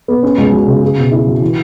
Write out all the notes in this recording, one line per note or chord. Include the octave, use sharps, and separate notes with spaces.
B3
C#4
C#2
F#3
C#3
G#4
B2
E4
F#3
E3